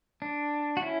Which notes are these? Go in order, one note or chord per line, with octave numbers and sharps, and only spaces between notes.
D4
F#4
C#4 E4